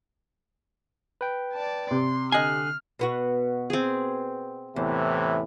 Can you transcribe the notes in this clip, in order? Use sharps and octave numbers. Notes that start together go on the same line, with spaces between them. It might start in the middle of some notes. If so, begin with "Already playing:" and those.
B4 G5
D5 A5
C3 C6
D3 D#5 G#5 F6 F#6 C7
B2 B3 F#4
C4 G#4
E2 A2 C3 E3